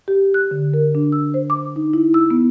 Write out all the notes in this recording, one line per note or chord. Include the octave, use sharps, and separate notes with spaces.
G4
F#6
D3
A#4
D4
E6
C5
D6
D#4
E4
E6
B3